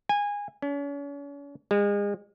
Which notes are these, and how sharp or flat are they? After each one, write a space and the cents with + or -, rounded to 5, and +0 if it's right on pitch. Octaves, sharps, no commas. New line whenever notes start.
G#5 -20
C#4 +40
G#3 -35